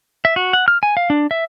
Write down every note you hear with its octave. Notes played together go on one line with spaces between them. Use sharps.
E5
F#4
F#5
F6
G#5
F5
D4
E5